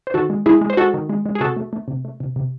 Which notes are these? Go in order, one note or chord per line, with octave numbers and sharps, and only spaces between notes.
C5
D#3 F#4 A4
G#3
G#3 E4 G#4
G#3
C5
G#3 F#4 A4
D#3
G#3
G#3
G#4
C3 F#4 A4
A3
A3
C3
A3
C3
C3